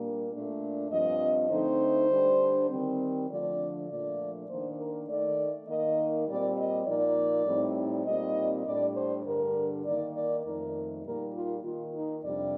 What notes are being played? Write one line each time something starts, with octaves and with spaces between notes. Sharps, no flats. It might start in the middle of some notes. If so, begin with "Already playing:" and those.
Already playing: A#2 G3 A#3 D4
A#2 A3 D4
G2 F3 C4 D#5
D3 A3 C4 D#4 C5
D3 G3 D4
D#3 G3 C4
D3 F3 A3 D4 D5
A#2 F3 A3 D4 D5
D#3 A#3 D4 C5
A#4
D#3 A3 D#4 D5
D#3 A#3 D#4 D#5
A#2 G3 C4 D5
D#5
A#2 F3 A#3 D#4 D5
A2 G3 C4 D#4
A#2 G3 C4 D#4 D#5
A2 G3 D4 D5
C5
G2 D3 G3 D4 A#4
D#3 A#3 D#4 D5
D5
F2 D#3 A3 D#4 A#4
A#2 G3 A#3 D#4 A#4
F4
D#3 A#3 D#4 F4
D#4
F2 C3 G3 D4 D5